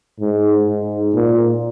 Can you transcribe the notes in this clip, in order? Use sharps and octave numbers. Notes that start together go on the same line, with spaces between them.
G#2
G#2
A#2